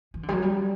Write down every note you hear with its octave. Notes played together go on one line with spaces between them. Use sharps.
E3
D3
G3
F#3
G3